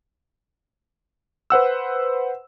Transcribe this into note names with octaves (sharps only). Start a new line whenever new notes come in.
B4 C5 F#5 E6